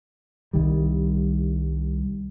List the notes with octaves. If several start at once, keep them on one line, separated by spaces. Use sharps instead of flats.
C2 D#3 G3